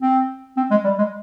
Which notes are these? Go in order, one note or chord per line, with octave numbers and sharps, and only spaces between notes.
C4
C4
G#3
G3
G#3